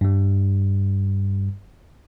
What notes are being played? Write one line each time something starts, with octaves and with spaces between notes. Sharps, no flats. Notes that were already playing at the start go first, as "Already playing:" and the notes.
G2 G3